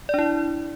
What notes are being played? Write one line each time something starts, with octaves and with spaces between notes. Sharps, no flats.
D4 E4 D5